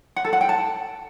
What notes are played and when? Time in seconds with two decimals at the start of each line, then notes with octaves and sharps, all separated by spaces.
0.16 F#5
0.25 A4
0.33 F#5
0.41 G5
0.49 A5